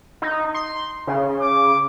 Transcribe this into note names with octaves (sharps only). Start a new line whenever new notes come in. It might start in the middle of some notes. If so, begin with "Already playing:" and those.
D#4
C6
C#3
D6